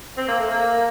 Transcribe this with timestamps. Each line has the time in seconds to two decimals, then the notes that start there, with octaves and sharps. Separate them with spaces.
0.17 C4
0.28 A#3
0.40 A3
0.50 A#3